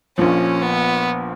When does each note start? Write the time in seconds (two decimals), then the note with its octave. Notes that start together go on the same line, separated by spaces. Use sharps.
0.17 A#1 A#2 F3 C#4
0.62 B3